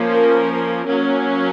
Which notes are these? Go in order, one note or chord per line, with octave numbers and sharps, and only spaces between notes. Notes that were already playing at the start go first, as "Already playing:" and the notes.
Already playing: F3 A#3 C#4
A#4
F#3 A#3 C#4